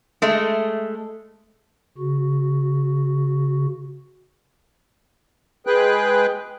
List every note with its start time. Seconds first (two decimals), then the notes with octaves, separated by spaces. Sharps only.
0.22 G#3 A3
1.98 C#3 F#4
5.67 G#3 G#4 B4 G5 F#6